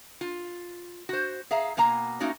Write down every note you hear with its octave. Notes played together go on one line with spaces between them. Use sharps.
F4
F#4 C5
G#4 E5 F5 A#5
B2 A#3 G#5 A#5
A3 A#3 C#4 D#4 F#4